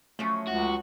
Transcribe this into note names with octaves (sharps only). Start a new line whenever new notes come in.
F3 F#3 A3 C#4
C#2 F#4